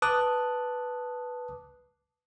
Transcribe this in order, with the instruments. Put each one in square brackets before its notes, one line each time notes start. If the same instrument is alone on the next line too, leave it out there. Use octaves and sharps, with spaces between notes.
[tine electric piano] B4 A5 D6 D#6 F#6